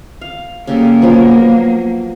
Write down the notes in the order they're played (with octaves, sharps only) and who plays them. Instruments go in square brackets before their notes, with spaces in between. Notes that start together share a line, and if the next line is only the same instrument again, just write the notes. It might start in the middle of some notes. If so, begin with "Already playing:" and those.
[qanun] F5
[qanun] C#3 G3 A4 [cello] A#3
[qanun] F3 F#3 B3